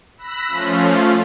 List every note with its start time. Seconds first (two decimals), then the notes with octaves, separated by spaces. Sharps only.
0.17 B5 E6 F#6 A#6 B6
0.48 F3 A3 C#4 F4